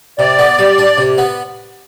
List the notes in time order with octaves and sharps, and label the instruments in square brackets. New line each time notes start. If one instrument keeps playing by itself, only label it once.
[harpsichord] C3 [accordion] D5
[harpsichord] B3
G3
D4
C3
B3